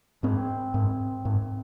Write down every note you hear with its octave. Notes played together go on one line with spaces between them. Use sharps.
G#2 C4
G#2
G#2